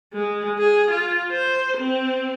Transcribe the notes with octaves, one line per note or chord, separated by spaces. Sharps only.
G#3
G#4
F4
C5
C4